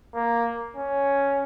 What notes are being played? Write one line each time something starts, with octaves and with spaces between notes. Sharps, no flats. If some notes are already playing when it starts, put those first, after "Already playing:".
A#3
C#4